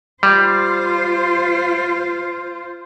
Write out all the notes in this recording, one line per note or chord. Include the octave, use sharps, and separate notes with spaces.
G3 F4 C5